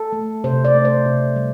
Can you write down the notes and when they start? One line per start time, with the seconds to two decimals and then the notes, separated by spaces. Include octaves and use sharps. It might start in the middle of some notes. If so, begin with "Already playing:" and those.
Already playing: A4
0.12 A3
0.44 C3 C5
0.65 D5
0.75 A3
0.85 C5
1.05 C3
1.36 G3